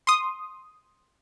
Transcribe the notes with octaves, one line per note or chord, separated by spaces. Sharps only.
C6 D#6